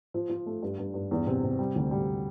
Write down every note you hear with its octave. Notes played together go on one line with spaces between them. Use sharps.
F3
F3
A3
G2
G2
G2
E2
C3
C3
G3
D2
G3